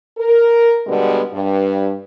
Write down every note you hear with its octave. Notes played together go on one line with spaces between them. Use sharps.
A#4
B2 D3 G3 G#3 B3
G2